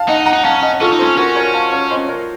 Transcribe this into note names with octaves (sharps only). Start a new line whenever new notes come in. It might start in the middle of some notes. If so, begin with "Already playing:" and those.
Already playing: F5 A5
D#4 D#5 F#5
F#5 A#5
D#4
C#4 F5 A5
D#5 F#5
C#4 F4 A4
D#4
C#4 A4 C5
C#4 F#4 A#4
A#4 C#5
F5 A5
C#5 F5
C5 D#5
A#4 C#5